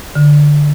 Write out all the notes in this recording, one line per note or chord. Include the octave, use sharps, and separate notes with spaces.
D3